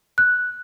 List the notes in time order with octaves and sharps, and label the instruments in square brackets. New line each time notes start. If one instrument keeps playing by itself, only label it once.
[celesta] F#6